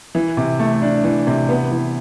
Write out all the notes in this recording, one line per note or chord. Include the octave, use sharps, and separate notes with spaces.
E3
C3
A3
D4
E3
C3
B3
E3